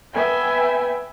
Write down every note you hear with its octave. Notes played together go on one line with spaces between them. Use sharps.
B3 B4 E5 G5 G#5